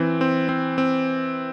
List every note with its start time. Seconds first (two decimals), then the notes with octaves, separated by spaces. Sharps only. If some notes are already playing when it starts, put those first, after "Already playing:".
Already playing: E3 C4
0.21 C4
0.49 C4
0.78 C4